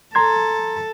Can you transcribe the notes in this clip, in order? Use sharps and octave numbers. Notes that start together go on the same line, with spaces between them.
A4 A#5 C6 G#6